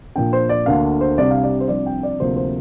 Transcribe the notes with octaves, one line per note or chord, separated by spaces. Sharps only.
A#2 F3 A#3 D4 G5
C5
D5
D2 D3 A#3 D4 F5
C5
C2 C3 G3 D4 D5
F5
D5
C5
C2 C3 F3 D4 D5
G5
D5
D2 C3 F3 A#3 C5
C5